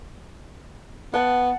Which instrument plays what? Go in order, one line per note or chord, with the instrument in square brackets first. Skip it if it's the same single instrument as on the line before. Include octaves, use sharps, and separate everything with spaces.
[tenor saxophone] B3 [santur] F#5 A5